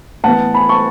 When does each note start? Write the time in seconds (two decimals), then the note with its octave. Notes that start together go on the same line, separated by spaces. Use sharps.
0.23 A2 E3 B3 F#5 A5
0.54 G#5 B5
0.69 A5 C#6